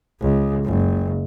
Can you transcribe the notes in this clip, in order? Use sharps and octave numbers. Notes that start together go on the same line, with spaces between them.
C#2
F#1